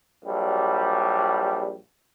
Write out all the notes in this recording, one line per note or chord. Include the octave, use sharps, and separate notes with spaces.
A#1 F#3 G3